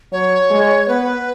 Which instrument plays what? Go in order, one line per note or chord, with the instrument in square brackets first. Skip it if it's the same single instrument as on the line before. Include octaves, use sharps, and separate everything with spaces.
[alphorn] F#3 [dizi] C#5
[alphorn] G#3
[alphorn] B3 [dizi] B4